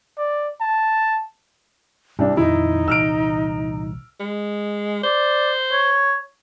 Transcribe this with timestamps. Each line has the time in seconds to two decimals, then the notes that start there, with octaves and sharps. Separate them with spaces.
0.18 D5
0.61 A5
2.19 C2 G3 D4
2.37 F2 A#2 D#3 D#4 E4
2.88 C2 A#2 E3 E6 F6 D7
4.20 G#3
5.04 C5 D5
5.72 C#5